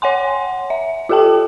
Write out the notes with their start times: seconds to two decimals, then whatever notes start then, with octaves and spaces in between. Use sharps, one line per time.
0.02 C#5 F#5 G#5 C6
0.70 E5
1.09 F4 G4 A4 G5 A5